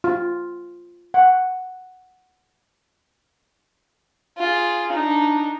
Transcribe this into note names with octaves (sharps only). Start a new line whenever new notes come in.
F4
F#5
F4 G#4
D4 D#4